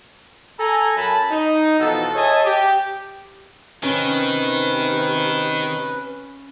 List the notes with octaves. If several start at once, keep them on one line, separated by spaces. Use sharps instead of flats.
A4 G#5 A#5
F#2 G#5 A5 B5
D#4
B2 E3 F3 A4
G#4 C#5 D#5 E5 G#5 A5
G4
C3 D#3 C#4 B4